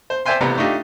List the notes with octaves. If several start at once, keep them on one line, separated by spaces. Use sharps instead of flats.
C5
C5 D5 E5 G5 G#5 C6
A1 C3 B3 D5 A#5
A3 D4 D#4 F4 G4